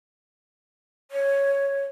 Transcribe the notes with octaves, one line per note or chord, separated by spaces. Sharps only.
C#5